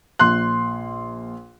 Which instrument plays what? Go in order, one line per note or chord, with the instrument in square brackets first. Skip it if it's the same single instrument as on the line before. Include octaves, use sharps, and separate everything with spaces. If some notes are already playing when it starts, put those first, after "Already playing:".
[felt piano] A#1 C6 F#6